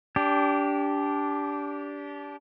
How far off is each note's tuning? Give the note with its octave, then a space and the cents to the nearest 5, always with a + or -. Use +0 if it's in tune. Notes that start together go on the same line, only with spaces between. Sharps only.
D4 -25 G4 +0